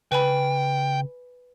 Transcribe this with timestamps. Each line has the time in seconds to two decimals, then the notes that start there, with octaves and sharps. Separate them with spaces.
0.12 C#3 B4 G5 G#5 B5